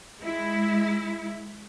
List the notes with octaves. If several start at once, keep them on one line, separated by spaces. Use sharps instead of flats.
G#3 E4